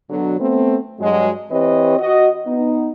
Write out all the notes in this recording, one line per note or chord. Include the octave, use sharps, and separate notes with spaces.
B2 D3 F#3
A3 B3 C4
G2 F#3 G#3
E3 C4 G4 B4 C#5 D#5
F#4 D#5
B3 D#4